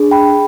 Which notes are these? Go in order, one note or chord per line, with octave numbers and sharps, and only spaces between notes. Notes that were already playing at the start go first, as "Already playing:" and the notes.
Already playing: D4 G#4
G5 B5
G#4